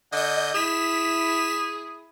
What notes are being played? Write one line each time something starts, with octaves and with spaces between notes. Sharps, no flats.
D3 D#5 G6
E4 G#4 B6 E7